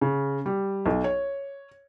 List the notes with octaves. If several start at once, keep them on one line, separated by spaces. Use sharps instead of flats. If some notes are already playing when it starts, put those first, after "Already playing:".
C#3
G3
B1
C#5